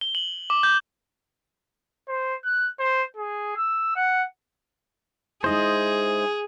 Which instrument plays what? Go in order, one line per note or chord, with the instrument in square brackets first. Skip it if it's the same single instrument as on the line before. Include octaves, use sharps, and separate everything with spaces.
[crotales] G7
F#7
D6
G6
[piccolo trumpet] C5
F#6
C5
G#4
E6
F#5
[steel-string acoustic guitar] G#3 D#4 E4 [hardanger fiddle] G#4 [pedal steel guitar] C5 D#5